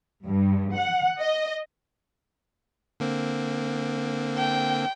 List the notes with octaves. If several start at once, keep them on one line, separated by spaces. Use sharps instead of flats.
G2
F#5
D#5
D3 A#3 C4
G5